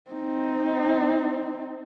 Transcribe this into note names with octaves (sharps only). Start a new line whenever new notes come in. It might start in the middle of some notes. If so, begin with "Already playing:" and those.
C4 D#4